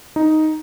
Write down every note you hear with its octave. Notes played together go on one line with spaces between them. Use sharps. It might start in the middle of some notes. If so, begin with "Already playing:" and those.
D#4